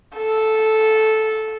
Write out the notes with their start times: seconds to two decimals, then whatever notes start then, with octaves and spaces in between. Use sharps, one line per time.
0.17 A4